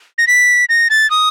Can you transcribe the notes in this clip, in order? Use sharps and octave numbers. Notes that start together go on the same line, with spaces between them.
A#6
B6
A#6
A6
D#6